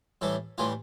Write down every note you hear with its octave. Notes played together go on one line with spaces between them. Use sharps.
A2 E3 G3 A4
A2 E3 G3 F4